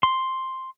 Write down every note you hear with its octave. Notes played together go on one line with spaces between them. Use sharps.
C6